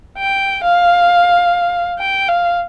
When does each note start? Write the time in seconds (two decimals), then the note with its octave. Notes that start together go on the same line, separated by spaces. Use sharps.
0.18 G5
0.64 F5
1.99 G5
2.29 F5